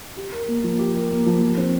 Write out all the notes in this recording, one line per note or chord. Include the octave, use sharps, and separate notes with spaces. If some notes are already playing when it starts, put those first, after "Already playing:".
G4
A#4
A#3
F3
G4
A#4
A#3
F3
F3
C4